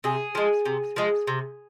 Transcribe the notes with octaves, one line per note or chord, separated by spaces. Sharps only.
C3 G#4
F3 G#3
C3
F3 G#3
C3